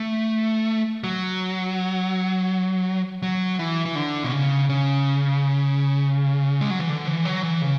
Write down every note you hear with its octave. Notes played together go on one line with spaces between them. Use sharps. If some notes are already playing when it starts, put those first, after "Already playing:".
Already playing: A3
F#3
F#3
E3
E3
D3
B2
C#3
C#3
G#3
F#3
E3
D3
E3
F#3
E3
C#3